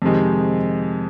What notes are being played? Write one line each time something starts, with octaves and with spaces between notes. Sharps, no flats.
F2 C3 D#3 G#3